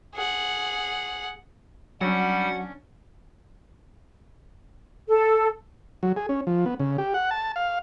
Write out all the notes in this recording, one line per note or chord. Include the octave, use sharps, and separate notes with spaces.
G#4 F#5
F#3 G3 C#4 D4 F#5
A4
F#3
G#4
C#4
F3
B3
C#3
G4
F#5
A5
F5